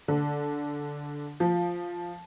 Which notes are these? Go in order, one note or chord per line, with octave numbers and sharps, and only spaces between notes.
D3
F3